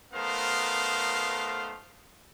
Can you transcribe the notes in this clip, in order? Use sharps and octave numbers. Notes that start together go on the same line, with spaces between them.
A3 B3 D#4 A#4 C5 F5